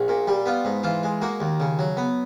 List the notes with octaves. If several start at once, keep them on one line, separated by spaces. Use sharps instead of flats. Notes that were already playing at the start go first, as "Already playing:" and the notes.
Already playing: A#1 F#4
A#2
G3
B3 F4
G#2
E3 F4
G#3
A#3 F#4
D#2
C#3
F#3
B3